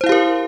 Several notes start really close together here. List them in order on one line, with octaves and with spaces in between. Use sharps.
C5 E4 F5 G4 A#4